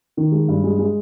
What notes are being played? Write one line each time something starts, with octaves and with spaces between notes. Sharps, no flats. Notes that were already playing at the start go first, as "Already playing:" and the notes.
D#3
G#3
G2
G#3
G#3